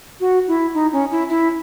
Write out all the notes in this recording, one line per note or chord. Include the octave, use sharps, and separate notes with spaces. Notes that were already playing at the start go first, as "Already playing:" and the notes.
F#4
E4
D#4
C#4
E4
E4